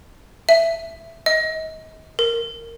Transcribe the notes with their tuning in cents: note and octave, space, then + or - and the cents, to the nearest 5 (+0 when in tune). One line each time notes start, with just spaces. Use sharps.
E5 +5
D#5 +35
A#4 -10